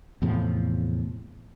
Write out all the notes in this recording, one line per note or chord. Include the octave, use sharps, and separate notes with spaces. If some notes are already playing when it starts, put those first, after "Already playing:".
E2 A2 C3 F3